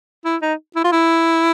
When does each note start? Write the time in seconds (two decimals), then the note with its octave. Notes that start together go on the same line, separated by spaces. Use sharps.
0.25 E4
0.42 D#4
0.76 E4
0.84 F4
0.92 E4